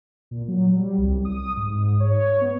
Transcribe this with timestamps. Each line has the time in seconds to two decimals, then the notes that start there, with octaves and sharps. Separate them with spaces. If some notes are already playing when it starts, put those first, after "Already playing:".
0.31 A#2
0.48 F#3
0.74 G3
0.98 C2
1.25 D#6
1.57 G#2
2.00 C#5
2.41 B3